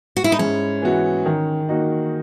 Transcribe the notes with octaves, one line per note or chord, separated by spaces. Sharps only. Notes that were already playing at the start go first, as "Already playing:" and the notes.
F#4
E4
D#4
G#2 C#4
E3 B3 F#4
D#3
A#3 D#4 F#4